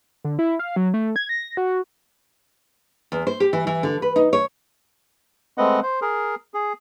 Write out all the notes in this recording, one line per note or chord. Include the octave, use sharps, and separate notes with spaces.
D3
E4
F5
F#3
A3
G#6
A#6
F#4
E2
C5
G4
E3
E3
D3
B4
D#4
C#5
G#3 A3 C4 B4 D#5 F#5
C5
G#4 A#4
G#4